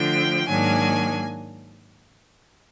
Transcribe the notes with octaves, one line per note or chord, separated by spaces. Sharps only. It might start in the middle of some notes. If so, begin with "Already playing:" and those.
Already playing: D3 F3 A3 G5
G#2 D#3 F#3 A#3 D4 G#5